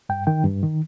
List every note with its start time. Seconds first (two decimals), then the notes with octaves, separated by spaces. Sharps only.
0.09 G2 G5
0.27 D#3 G5
0.44 G2
0.63 D#3